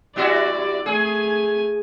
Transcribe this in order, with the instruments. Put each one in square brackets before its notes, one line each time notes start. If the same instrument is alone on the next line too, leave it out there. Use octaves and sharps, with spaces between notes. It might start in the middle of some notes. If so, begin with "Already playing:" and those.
[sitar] G3 E4 F#4 [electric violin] D5
[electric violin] A3 G#5 [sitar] G#4